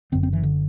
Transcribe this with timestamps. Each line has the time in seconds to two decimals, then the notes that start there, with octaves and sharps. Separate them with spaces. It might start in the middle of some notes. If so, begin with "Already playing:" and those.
0.12 F#1 F#2 D3 C4
0.23 C4
0.33 E3
0.43 D3